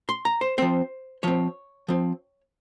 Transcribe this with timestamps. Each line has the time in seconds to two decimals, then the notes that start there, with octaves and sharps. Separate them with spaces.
0.09 C6
0.25 A#5
0.41 C5
0.58 F3 C4 C5
1.23 F3 C4 C#5
1.88 F3 C4